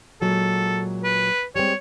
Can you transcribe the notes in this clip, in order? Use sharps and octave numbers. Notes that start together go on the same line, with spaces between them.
A#2 F#3 G#3 A4
B4
G3 G#3 C4 C#5